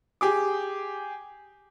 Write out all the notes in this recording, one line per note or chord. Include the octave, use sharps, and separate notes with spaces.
G4 G#4 D6